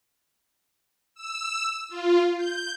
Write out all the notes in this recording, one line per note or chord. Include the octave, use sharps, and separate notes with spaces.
E6
F4
G6